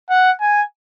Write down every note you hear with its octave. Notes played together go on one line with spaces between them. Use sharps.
F#5
G#5